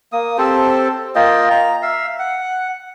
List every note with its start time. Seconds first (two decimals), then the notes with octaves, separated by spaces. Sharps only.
0.12 A#3 D#6
0.38 C4 G4 A4 C5
1.15 A#3 F4 D#5 G5
1.50 A#5
1.82 E5 F5
2.19 F#5